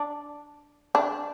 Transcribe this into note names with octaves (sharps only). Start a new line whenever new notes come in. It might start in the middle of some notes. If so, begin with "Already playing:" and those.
Already playing: D4
D4